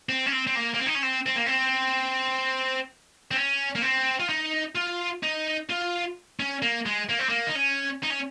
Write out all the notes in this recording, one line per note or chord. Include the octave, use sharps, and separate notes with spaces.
C4
C#4
C4
C4
A#3
A#3
C4
D#4
C#4
C4
C4
A#3
C4
C4
C#4
A#3
C4
F4
D#4
F4
D#4
F4
C#4
A#3
G#3
A#3
C4
A#3
D#4
C#4
D#4
C#4